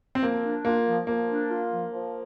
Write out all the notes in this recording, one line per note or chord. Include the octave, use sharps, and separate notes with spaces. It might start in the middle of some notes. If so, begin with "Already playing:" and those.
C4
F3 A#3
D4
A#3 F4
F3
F3 A#3
D4
F4
F3
F3